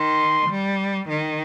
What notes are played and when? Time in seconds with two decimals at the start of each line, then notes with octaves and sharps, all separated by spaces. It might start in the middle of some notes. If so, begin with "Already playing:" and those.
Already playing: D#3 C6
0.50 G3
1.09 D#3